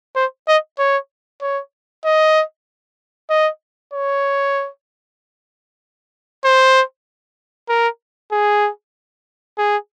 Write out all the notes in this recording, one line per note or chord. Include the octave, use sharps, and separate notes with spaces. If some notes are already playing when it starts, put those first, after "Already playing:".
C5
D#5
C#5
C#5
D#5
D#5
C#5
C5
A#4
G#4
G#4